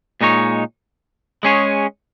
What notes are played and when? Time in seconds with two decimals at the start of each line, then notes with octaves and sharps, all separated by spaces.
0.21 A#2 G#3 D#4 A#4 C#5
1.43 G#3 C#4 G#4 C#5